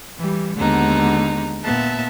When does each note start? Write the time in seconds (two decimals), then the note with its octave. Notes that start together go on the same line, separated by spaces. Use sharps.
0.17 E3 G3
0.56 D#2 D3 G#3 B3 D#4 A#5
1.63 A#2 B3 E5 A5